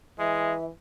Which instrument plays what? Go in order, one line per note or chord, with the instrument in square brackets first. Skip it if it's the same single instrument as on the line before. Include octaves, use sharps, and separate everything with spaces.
[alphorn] E3 [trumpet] G#3 [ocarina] E5